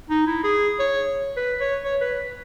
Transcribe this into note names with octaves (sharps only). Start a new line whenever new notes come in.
D#4
E4
G#4
C#5
B4
C#5
C#5
B4